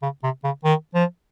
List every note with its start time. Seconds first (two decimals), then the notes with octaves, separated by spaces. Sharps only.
0.02 C#3
0.23 C3
0.44 C#3
0.64 D#3
0.95 F3